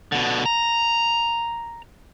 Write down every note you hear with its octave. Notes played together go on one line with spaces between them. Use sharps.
B2 D3
A#5